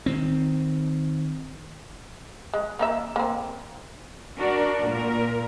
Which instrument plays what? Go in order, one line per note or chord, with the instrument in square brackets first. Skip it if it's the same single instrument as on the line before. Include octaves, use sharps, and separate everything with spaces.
[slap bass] D#3 C4
[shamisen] G#3
A#3 D#4 E5
A#3 C4
[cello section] D4 F#4 A#4 D5
A#2 A#4